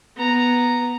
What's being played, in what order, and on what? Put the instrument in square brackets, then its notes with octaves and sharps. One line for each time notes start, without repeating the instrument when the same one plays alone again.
[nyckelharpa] B3 A#5